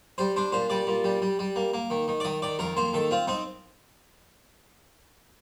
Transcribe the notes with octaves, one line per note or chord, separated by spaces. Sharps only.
G3 C5
D4 C5
A#2 C5
G3 D5
A#2
G3
G3
G3
A#3
A#3
D#3
D#3
D5
D#3 D#5
D#3 D5
F2 A#4
A#3 C5
D#3 A4
C4 F4
C4 D#4